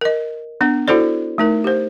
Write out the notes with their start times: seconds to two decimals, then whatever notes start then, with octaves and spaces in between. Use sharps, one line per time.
0.01 A#4 D#5
0.61 B3 D4
0.88 E4 F#4 A4 C5 D5
1.38 A3 D#4 A#4
1.64 G4 C5